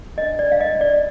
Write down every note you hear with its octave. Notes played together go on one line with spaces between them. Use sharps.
D4 D#5
D5
D4
F5
D#5
D4
D5